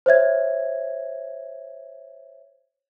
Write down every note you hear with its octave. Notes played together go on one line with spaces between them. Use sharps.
C5 C#5 E5 G#6